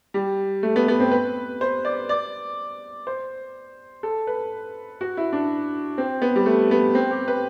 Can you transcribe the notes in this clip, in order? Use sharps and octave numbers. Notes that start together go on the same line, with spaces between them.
G3
A3
B3
B3
C4
B4
C5
D5
D5
C5
A4
B4
F#4
E4
D4
C4
B3
G3
A3
B3
C4
G4
B4